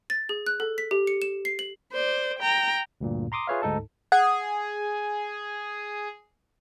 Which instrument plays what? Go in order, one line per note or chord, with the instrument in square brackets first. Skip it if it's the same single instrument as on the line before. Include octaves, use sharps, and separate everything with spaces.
[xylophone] A6
G#4
F#6
A4
B6
G4
C#7
E7
C7
F#7
[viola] C5 D5
G5 A#5
[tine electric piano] D2 G2 A#2
A#5 C6 D6 D#6
F4 G#4 B4 C#5 E5 F5
D2 G#2 D#4 A4 A5
[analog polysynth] G#4 [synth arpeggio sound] F#5